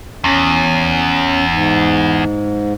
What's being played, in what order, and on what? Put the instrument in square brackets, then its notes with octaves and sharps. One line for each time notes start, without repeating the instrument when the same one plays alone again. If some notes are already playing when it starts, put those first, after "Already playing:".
[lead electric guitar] E2 [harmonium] C#4
[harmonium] G#2